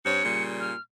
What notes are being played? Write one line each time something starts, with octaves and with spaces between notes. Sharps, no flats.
G2 C4 C#5 C#7
A#2 C#3 G3
F6